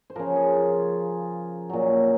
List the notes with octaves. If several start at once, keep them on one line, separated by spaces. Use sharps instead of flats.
C5
C#3 F3 A#4
G#4
F4
F4
A#2 F#3